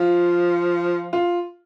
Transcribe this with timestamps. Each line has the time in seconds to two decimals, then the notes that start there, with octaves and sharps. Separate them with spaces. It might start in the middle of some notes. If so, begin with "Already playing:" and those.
Already playing: F3 F4
1.13 F4